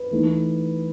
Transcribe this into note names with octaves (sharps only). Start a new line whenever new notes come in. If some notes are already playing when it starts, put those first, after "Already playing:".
Already playing: B4
E3 A3 D#4